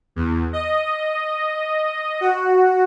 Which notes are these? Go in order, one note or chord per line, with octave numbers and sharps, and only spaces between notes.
E2
D#5
F#4